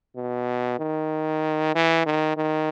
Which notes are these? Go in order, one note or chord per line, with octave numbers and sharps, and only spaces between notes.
B2
D#3
E3
D#3
D#3